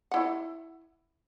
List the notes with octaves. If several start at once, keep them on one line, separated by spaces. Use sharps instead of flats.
E4 F#5